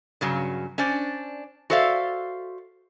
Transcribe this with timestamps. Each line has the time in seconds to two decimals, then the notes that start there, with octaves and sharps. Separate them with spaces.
0.21 G2 C#3 F#3
0.78 C#4 D4 C5 D5
1.70 F#4 A4 C5 D5 E5 F5